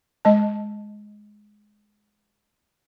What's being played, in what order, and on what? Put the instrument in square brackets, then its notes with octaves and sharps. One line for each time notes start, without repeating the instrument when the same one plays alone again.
[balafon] G#3 D#5 A5